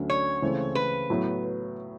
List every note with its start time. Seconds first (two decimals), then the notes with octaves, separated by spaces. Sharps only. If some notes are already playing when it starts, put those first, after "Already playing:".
Already playing: D2 D3 F#3 A3 C#4
0.10 C#5
0.42 C#2 C#3 E3 A3 C4
0.75 B4
1.10 A2 F#3 B3